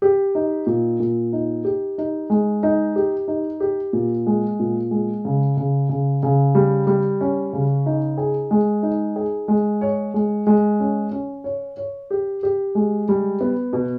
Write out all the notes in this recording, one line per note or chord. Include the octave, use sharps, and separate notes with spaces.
G4
D#4
A#2
A#2
D#4
G4
D#4
G#3
D#4
G4
D#4
G4
A#2
G#3
A#2
G#3
C#3
C#3
C#3
C#3
G3
G3
C#4
C#3
D#4
G#4
G#3
D#4
G#4
G#3
C#5
G#3
G#3
C#4
C#4
C#5
C#5
G4
G4
G#3
G3
B3
B2